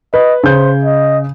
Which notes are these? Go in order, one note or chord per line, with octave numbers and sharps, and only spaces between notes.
B4 D#5
C#3 C5 G6
D#5